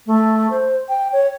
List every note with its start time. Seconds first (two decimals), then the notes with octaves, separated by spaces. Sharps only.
0.06 A3
0.50 C5
0.89 G5
1.12 C#5